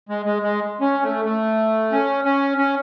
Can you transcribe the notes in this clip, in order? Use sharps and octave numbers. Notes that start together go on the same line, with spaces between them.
G#3
G#3
G#3
C#4
A3
A3
C#4
C#4
C#4